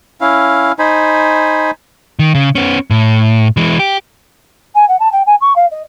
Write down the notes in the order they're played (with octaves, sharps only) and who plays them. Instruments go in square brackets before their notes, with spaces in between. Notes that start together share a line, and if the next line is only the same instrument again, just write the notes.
[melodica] C#4 E4 F5
D#4 C5 G#5 B5
[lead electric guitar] D#3
C#3
B3 C#4
A2
E3 G#3
G4
[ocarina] G#5
F#5
A5
G5
G#5
C#6
F5
D#5